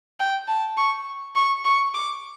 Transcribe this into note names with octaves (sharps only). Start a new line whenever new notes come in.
G5
A5
C#6
C#6
C#6
D6